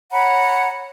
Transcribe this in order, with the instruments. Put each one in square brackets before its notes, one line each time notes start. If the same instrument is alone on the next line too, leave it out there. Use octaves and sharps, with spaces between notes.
[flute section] C#5 F#5 A#5 B5